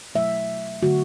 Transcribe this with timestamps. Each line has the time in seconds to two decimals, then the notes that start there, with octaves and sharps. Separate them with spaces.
0.15 B2 F#3 A3 E5
0.83 D3 F#3 A3 F#4